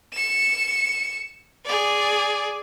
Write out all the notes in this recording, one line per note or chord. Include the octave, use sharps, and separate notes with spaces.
C#7 E7
G#4 D5